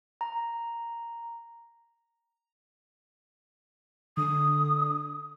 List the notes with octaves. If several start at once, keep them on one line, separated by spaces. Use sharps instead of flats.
A#5
D3 D#6